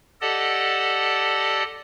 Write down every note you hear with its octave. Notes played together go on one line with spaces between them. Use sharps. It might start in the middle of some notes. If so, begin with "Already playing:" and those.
G4 A4 D5 D#5 F#5 A5